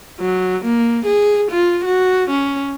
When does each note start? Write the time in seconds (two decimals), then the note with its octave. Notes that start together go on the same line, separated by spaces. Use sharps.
0.20 F#3
0.65 A#3
1.06 G#4
1.51 F4
1.85 F#4
2.30 C#4